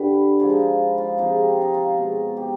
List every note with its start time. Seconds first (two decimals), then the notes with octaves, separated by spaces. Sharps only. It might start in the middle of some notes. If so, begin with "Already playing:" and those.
Already playing: G2 D3 G3 B4
0.39 G#2 F3 G#3 G#4
0.50 D#4
0.59 F4
0.98 F4
1.18 C3 F3 G#3 D#4
1.38 G4
1.50 F4
1.62 D#4
1.74 F4
1.97 B2 G#3
2.37 G4